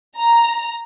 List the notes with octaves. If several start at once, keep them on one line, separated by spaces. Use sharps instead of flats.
A#5